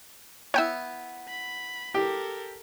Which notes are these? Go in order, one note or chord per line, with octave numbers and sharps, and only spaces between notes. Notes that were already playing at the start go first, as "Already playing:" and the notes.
B3 E4 C#5 G5 E6
B5
G4 A4 A#4